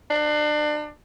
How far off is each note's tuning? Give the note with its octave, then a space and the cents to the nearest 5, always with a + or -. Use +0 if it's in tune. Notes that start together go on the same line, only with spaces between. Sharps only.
D4 +30